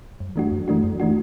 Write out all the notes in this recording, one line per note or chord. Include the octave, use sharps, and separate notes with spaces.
F#2
E3 A3 D4 F#4
F#2
E3 A3 D4 F#4
F#2
E3 A3 D4 F#4